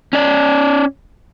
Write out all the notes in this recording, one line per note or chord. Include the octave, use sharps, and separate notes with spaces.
C#4 D5